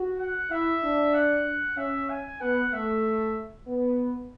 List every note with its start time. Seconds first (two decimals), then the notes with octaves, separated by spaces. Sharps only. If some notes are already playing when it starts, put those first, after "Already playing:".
Already playing: F#4
0.19 F#5
0.51 E4 E5
0.83 D4
1.14 F#5
1.77 C#4 E5
2.10 G#5
2.41 B3 F#5
2.73 A3 E5
3.67 B3